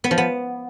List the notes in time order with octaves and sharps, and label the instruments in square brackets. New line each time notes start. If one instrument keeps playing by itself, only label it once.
[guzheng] B3
F3
B3